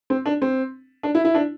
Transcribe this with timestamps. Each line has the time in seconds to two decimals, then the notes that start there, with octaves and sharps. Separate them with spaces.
0.10 C4
0.26 D4
0.42 C4
1.03 D4
1.15 E4
1.25 E4
1.35 D4